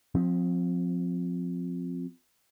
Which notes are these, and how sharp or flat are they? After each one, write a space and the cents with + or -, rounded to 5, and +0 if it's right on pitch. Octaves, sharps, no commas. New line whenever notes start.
F3 +25 C4 +0